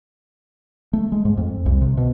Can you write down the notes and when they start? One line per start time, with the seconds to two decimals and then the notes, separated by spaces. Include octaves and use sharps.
0.93 A3
1.12 G#3
1.25 G#2
1.37 F2
1.66 C2
1.81 C3
1.97 B2